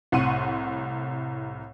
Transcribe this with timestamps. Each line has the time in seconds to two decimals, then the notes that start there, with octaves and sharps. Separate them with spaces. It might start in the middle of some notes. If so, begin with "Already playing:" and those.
0.12 C2 A2 F#5 C6 C#6 D#7